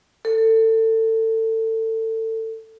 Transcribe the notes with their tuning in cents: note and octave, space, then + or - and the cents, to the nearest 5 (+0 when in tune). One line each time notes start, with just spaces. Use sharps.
A4 +25